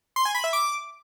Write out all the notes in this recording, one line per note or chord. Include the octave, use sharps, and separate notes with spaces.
C6
G#5
B5
E5
D6